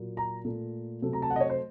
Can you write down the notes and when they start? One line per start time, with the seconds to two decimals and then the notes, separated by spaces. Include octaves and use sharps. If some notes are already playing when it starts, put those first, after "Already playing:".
Already playing: A#2 F#3 A#3
0.17 A#5
0.45 A#2 A3
1.02 C3 F#3 A3
1.13 A#5
1.22 A5
1.30 F#5
1.36 D#5
1.40 C#5
1.50 C5